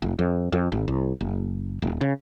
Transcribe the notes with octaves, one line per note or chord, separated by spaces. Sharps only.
F1
F2
F2
G#1
C2
F#1
D#1
C#3